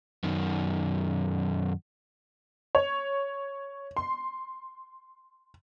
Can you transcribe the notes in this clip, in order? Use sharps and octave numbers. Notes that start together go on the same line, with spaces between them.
F#2 D#3
C#5
C6